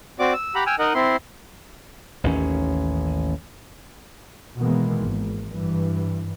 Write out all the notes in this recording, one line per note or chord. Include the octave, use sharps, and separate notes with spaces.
C4 F#4 D5 D6
E6
G4 F#5 A#5 B5
G5 G#5 E6 F6
D#4 A#4 D#5 F#5
C4 E4 C6
A1 D#2 C#4
B2 D#3 E3 G#3 A#3 B3
G#1
G2 E3